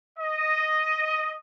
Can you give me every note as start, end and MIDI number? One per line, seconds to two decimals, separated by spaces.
0.18 1.32 75